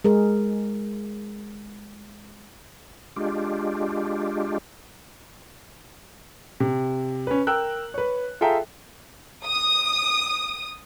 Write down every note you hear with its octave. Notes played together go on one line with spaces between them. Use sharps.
G#3 G#4 A#4
G#3 D4 F4 G4
C3
C#4 B4
A#4 G5 E6 F#6
B4 C#5
F4 G#4 A4 E5 G5 A#5
D#6